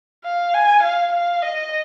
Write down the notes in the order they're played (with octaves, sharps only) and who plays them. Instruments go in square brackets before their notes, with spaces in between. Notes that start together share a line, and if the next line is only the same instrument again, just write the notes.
[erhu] F5
G#5
F5
F5
D#5